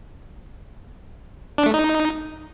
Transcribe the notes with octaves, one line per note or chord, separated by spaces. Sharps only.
D4
A3
D#4